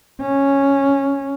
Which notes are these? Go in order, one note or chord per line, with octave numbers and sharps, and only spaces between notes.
C#4